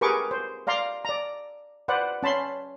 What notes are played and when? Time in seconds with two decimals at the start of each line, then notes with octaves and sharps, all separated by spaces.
0.01 G4 G#4 A#4 B4 C#6 D6
0.31 C5
0.67 D5 F5 A#5 C6
1.05 D5 A#5
1.88 B4 C5 D5 F#5
2.23 C#4 A5 B5 C6